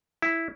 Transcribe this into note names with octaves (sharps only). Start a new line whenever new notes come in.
E4